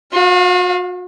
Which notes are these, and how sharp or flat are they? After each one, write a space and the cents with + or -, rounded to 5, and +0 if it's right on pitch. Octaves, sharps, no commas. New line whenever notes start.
F#4 -40 F5 +5